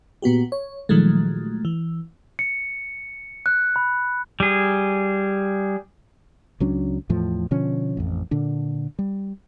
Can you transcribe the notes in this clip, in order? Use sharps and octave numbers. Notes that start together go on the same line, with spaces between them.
A#2 B3 F#4 G4
C#5
A#2 D#3 F3 F#3 G#3 A3
E3
C#7
F#6
B5
G3 G#4
C#2 F#3 C#4 D4
E2 A2 F3
B2 D3 F3 C#4
A1 F2
A#2 D3 D4
G3